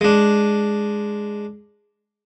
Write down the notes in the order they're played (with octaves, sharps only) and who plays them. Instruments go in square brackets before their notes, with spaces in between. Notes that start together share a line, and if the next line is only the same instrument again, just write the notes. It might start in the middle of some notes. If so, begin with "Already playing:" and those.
[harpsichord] G#3 D4